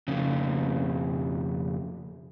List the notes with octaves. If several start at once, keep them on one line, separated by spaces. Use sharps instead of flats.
F2 C#3